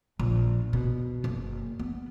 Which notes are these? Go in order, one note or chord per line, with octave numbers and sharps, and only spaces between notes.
A#1
B2
F#1
B3